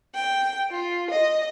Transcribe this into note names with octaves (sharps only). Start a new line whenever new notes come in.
G5
F4
D#5